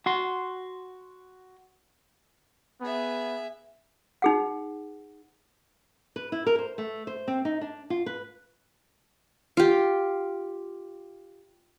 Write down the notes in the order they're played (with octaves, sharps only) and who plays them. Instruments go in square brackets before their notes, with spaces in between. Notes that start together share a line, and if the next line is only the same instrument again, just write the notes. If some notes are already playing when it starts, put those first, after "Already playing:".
[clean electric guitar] F#4 C6
[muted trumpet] B3 [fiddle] G#4 E5
[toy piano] D#4 G#4 F#5
[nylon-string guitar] B4
E4
A#4
C5
A3
C5
C4
D#4
D4
F4
B4
[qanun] F4 G4